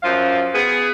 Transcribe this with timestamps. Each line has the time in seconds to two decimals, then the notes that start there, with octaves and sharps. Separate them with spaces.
0.03 F#2 F3 C5 F5
0.53 B3 G#4